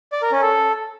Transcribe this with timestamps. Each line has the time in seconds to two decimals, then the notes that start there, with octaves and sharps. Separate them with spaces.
0.12 D5
0.22 A#4
0.32 C#4
0.42 A4